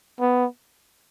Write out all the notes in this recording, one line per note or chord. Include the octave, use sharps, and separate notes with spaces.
B3